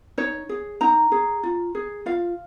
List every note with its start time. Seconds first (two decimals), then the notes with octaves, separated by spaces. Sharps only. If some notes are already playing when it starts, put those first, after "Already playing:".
0.18 D#4 C#5
0.49 G#4
0.81 D#4 A#5
1.12 G#4
1.43 F4
1.75 G#4
2.06 F4 F5